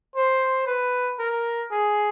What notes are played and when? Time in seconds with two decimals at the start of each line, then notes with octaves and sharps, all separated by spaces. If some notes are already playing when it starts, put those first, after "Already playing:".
0.16 C5
0.66 B4
1.19 A#4
1.71 G#4